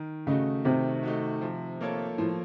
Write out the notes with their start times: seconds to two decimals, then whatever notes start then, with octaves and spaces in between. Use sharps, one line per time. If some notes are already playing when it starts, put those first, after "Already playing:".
Already playing: D#3
0.27 C#3 A3 D#4 F#4
0.65 C3 D#3
1.03 A3 D#4 F#4
1.41 F3
1.81 A#3 F4 A4 C#5
2.18 A2 F3